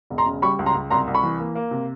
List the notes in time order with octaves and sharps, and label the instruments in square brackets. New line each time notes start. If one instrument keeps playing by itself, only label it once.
[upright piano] E1
A#5 C6
C#3
G3 B5 C#6
C#2
A#5 C6
C#2
C2 A#5 C6
C2
B5 C#6
E3
A#3
A#3
C3